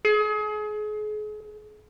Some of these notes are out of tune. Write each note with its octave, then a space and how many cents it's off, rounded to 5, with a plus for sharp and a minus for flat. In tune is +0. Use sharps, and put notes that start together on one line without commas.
G#4 +35